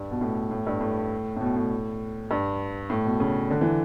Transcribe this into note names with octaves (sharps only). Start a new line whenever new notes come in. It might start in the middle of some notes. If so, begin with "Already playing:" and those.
Already playing: G2
B2
A2
A2
G2
A2
A2
B2
A2
G2
A2
B2
C#3
D3
E3